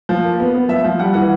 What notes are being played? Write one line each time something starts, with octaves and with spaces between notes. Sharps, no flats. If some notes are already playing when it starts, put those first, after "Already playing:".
F3
A#3
B3
B3
F3 E5
F3
G3 F#5
E3 F#5